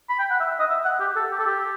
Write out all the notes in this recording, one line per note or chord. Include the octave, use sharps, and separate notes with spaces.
B5
G5
F#5
E5
D#5
E5
F#5
G4
A4
G4
A4
G4